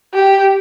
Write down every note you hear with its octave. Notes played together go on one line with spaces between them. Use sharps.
G4